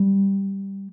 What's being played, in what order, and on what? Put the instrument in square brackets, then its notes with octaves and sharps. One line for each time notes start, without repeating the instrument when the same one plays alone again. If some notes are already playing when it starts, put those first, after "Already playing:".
Already playing: [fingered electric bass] G3